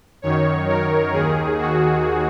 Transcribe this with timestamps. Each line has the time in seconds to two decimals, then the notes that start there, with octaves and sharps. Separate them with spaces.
0.22 F#2 D#3 C#5
0.67 A#4
1.13 D#2 D#3 G#4
1.58 F#4